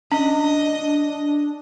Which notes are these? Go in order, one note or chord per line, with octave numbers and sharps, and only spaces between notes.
C#4 D4 D#5